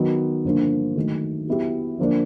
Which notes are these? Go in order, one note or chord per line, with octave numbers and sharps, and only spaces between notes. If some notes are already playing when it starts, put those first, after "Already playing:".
Already playing: D#3 F#3 B3
G2 D3 F3 A#3
D#3 F#3 A3
F#3 B3 E4 G4
D3 F3 A#3 D4